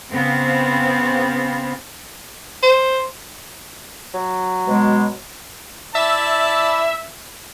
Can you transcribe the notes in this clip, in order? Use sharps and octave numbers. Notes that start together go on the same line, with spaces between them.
C#3 B3 C4 F5
C5
F#3
B2 G#3
E4 D5 E5 A5